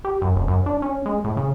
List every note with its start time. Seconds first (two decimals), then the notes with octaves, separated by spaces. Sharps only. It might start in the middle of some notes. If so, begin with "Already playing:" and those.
0.04 G4
0.22 F#2
0.35 F1
0.48 F#2
0.66 D4
0.82 C#4
1.06 G#3
1.24 A2
1.37 C#3